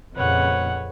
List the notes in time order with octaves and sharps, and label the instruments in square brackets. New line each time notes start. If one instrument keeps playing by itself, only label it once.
[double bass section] F2 A#2 C#3 [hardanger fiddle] B4 C#5 [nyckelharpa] F#5